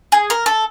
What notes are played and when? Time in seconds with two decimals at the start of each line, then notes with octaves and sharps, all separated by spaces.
0.12 G#4
0.30 A#4
0.46 A4